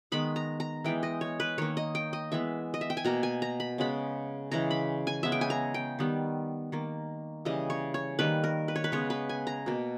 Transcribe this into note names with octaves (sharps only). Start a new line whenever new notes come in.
D#3 G#3 B3 B5
A#5
A#5
E3 G#3 B3 G5
D#5
C#5
B4
D#3 A#3 C#5
D#5
G5
D#5
E3 G#3 B3 E5
D#5
E5
G5
G#5
B2 A#3 A#5
G#5
A#5
B5
C#3 G#3 B3 B5
C#3 E3 G#3 A#5
B5
G#5
C#3 G#3 B3 E5
G5
G#5
A#5
G5
D#3 G3 B3
D#3 A#3
C#3 E3 G3 D#5
C#5
C#5
D#3 G3 A#3 B4
A#4
B4
C#5
B4
C#3 G#3 B3 C#5
B4
G#5
A#5
B2 A#3